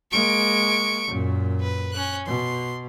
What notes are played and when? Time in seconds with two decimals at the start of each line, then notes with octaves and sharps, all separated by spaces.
0.12 G#3 A#3 C#6 D7
1.07 F#2 A#2
1.61 B4
1.93 C#4 F#6
2.26 B2 C6